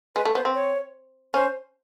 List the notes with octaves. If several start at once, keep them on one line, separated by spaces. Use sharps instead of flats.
G#3 B4
A3
B3 C5
C4
C#5
C#4 C5